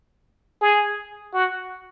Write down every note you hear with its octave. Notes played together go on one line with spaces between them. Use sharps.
G#4
F#4